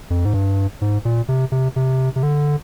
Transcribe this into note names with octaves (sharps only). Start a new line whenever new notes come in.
F2
G#2
G2
G#2
A#2
C3
C3
C3
C3
D3